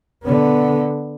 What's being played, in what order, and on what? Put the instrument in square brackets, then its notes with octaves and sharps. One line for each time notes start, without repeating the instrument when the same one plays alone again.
[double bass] D3 B3